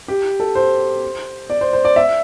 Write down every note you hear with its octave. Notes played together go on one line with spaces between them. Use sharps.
G4
A4
C5
D5
C5
C5
D5
E5